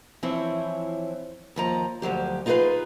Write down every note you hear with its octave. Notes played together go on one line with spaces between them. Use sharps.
E3 F3 C4 E4 C#5
D#2 F3 A#5
D2 F3 F#3 G4
D#4 F4 G#4 A#4 B4 F5